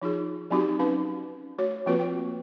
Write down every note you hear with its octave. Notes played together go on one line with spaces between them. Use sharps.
F3 D#4 F4 G#4
F#3 C4 D#4 F#4 G4
C#4 D#4 B4 F5
A3 F#4 C#5
F3 A#3 C4 F4 F#4 B4
G5